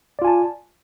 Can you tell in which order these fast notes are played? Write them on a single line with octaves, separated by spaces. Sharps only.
D5 F4 G#5 A5